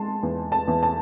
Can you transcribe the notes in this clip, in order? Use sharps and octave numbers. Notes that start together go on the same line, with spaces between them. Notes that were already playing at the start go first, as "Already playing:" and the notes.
Already playing: G#3 A5 C6
E2
A5
E2
A5